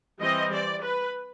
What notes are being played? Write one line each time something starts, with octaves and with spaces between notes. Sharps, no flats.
E3 G3 C4 D#5
D5
B4